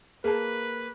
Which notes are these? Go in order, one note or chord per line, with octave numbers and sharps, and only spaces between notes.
A#3 G#4 B4 A5